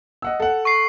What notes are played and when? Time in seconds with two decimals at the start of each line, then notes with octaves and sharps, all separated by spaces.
0.22 D#5 F#5 E6
0.40 A4 F#5
0.65 C#6 C7